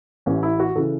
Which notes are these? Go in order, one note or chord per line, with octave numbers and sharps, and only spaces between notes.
A1 A2 E3 C#4
E4
F#4
C#3 E3 A4